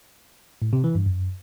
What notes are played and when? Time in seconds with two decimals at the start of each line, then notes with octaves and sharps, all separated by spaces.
0.62 A2
0.73 C3
0.84 E3
0.95 G2
1.06 F#2